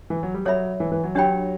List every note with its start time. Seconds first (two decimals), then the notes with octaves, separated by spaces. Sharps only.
0.10 E3
0.23 F#3
0.34 G3
0.45 F#3 A4 C#5 E5 B5
0.80 E3
0.92 E3
1.04 F#3
1.15 F#3 D4 G4 C#5 G5 B5